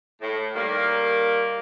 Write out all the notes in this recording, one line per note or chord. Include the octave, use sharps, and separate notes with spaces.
A2
D#3 G3 A#3